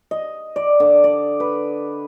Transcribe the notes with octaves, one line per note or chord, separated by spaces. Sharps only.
D#5
D5
D3
D5
B4